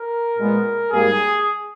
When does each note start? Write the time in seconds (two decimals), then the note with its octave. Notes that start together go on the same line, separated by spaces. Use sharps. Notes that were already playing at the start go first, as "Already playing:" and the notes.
Already playing: A#4
0.39 A#2 G#3 B3
0.92 G#2 G3 A#3 G#4